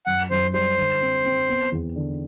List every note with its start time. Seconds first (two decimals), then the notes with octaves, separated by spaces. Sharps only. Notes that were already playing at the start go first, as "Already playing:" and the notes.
0.06 F#2 F#5
0.31 F#2 C5
0.54 G3 C5
0.78 D3
1.01 C4
1.25 C4
1.48 B3
1.72 E2
1.96 D3